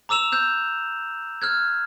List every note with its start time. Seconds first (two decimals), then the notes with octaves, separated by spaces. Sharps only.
0.09 A#5 D6 E6 E7 F7
0.32 E6 F#6 G6
1.42 F6 F#6 G#6